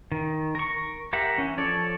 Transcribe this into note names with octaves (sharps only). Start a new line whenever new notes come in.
D#3
A#4 C#6
G4 A#4 E5 F#5
E3 C#4
F3 A4 C#5 D5